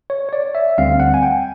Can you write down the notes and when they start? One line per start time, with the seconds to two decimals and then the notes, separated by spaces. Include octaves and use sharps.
0.10 C#5
0.29 C#5
0.33 D5
0.55 E5
0.78 D2 D3 G3 C4 F5
1.00 F#5
1.14 G#5
1.23 G5